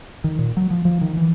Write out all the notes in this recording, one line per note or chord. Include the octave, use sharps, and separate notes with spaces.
D#3
A#2
F#3
F3
F3
D#3
E3